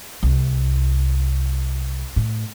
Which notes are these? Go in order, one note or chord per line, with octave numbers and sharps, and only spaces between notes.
C2
A2